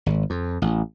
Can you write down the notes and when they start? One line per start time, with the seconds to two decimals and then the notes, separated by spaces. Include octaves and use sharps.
0.06 G#1
0.30 F2
0.62 A1